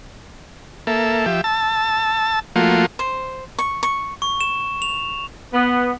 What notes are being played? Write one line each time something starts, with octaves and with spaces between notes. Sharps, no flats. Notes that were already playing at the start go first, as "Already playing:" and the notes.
A#3 A4 E5
F3 G4 E5
A5 E6
F3 A3 A#3 F4 F#4
C5
C#6
C#6
C#6
E7
F7
B3